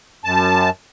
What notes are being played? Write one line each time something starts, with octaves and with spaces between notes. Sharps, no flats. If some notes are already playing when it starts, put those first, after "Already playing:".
F#2 A5